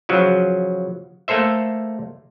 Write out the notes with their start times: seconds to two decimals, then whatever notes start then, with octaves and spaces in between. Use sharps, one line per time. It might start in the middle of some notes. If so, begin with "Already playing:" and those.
0.09 C#3 F3 F#3
1.28 A3 A#3 A4 C5 E5